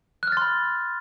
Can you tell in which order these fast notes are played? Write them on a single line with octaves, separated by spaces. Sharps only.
F#6 F6 A6 C6 B5